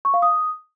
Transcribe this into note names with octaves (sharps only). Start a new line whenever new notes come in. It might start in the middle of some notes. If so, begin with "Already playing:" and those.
C#6
F5
D#6